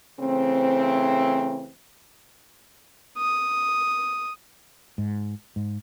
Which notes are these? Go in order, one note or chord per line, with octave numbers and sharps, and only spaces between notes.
C#3 E3 A3 C4
D#6
G#2
G#2